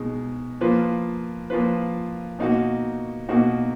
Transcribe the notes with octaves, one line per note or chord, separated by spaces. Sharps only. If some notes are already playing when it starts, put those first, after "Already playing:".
Already playing: B2 G#3 D#4
F3 A#3 F4 B4
F3 A#3 F4 B4
B2 A#3 D#4 F#4
B2 A#3 D#4 F#4